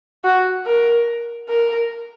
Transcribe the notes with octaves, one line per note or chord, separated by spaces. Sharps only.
F#4
A#4
A#4